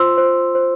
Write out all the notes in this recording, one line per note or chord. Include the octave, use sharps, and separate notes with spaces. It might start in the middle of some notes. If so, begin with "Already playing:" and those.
Already playing: F4 C5 C6 E6
C5
C5